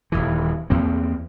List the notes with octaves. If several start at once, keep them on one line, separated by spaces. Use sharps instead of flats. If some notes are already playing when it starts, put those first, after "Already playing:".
D#1 B1 E3
E2 A#3 C4